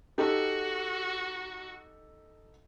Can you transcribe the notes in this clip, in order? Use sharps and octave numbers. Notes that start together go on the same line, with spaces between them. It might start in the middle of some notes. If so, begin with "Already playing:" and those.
D#4 F#4 G4 A4